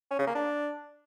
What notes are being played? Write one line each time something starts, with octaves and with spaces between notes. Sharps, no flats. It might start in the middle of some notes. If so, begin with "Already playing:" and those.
C#4
C#3
A#3
D4